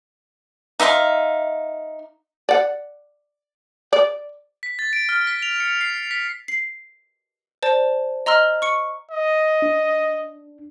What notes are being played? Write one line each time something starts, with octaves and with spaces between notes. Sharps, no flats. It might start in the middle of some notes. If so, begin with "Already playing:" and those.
D#4 E5 F5 C6
D5 F#5
D5
B6
A6
D7
F6
B6
F7
C#7
C7
B6
C7
C5 D5 A5
D#5 A#5 C6 E6 F6
C#6 C#7
D#5
D4